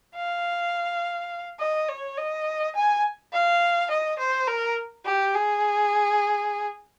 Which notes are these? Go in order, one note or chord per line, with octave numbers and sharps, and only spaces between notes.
F5
D#5
C#5
D#5
G#5
F5
D#5
C5
A#4
G4
G#4